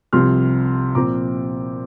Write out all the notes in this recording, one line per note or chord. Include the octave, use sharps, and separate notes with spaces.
C2 C3 F3 C6 F6
A#2 F3 C4 A#5 D6